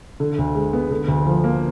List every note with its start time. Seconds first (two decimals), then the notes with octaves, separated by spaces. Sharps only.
0.20 D3
0.38 D2
0.55 G#3
0.73 B3
0.91 D3
1.08 D2
1.26 F3
1.44 A#3